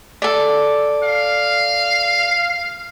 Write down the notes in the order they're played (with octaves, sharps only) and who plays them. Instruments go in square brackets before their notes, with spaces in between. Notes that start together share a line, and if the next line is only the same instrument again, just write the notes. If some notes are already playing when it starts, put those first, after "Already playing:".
[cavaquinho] A4 D5
[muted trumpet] F5